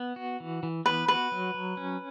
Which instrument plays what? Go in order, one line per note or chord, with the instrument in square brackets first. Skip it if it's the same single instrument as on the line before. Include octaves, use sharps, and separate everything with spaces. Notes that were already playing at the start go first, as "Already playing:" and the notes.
Already playing: [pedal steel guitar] B3
F#4
E3
E3
[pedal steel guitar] B3 [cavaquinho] B4
[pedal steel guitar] F#4 [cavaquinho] B4
[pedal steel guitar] F#3
F#3
C#4